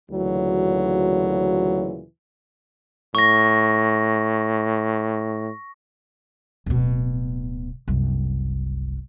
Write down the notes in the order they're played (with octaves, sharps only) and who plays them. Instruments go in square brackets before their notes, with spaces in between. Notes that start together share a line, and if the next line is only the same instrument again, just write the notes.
[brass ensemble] D2 A#2 C#3 E3 F#3
[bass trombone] A2 [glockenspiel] C#6 A#6
[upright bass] D1 B2
F#1 C2